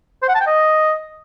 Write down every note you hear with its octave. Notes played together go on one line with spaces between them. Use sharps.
C5
F#5
A5
G5
D#5